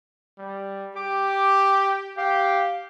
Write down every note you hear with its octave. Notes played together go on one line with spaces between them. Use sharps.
G3
G4 D6
G4 F5